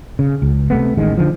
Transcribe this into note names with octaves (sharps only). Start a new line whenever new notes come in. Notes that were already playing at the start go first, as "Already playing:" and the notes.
C#3
C#2
C3 A3 B3
A1 D#3 G#3
D3 F3